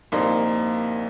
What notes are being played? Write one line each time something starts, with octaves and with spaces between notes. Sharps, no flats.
C2 A#2 F3 A#3 D#4 C6